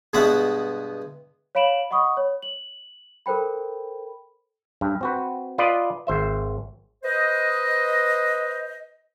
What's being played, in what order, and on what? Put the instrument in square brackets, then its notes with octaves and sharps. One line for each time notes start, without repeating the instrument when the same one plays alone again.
[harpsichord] G2 B2 G#3 B3 E5 F#5
[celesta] C#5 F5 B5 D7 E7 F#7
D#5 F#5 B5 C#6 D#6
C#5
F#7
A4 A#4 C5 G5 B5
[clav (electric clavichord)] G2
C4 F#4 B4
F4 B4 D5 D#5
G#1 C5 E5
[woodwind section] B4 C5 D#5